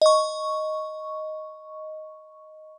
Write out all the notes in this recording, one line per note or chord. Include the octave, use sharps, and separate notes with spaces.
D#5 C#6